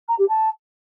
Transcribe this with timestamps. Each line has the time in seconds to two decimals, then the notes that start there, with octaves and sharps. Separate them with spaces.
0.08 A#5
0.18 G4
0.28 A5